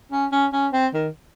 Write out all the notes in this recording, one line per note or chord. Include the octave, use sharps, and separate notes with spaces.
C#4
C#4
C#4
C4
D#3